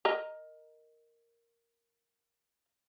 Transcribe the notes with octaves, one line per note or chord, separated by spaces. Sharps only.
A#4 D#5 A#5